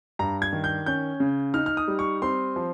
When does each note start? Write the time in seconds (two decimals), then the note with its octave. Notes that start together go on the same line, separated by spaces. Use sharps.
0.19 G2 A#5
0.42 G#6
0.53 D#3
0.64 G6
0.86 C#4 G6
1.20 C#3
1.54 D#4 F6
1.66 F6
1.77 D#6
1.88 G3
1.99 C#6
2.22 C4 C6
2.56 F3